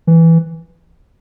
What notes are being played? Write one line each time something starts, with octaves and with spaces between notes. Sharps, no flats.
E3